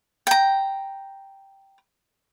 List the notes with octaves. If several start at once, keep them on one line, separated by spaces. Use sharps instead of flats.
G5 A#5